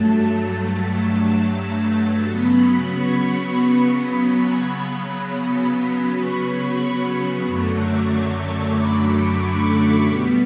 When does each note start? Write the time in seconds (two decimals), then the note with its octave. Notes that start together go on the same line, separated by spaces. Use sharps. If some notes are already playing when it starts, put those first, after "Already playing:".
Already playing: G2 F#3 A3 A5
1.65 A5
2.30 C#3 F#3 B3 B5
2.95 C#6
4.23 C#6
4.88 C#3 F#3 B3 B5
6.17 C#6
7.46 F#2 D3 F#3 A3 C#6
7.80 D6
8.11 C#6
8.77 B5
10.05 B2 G3 B3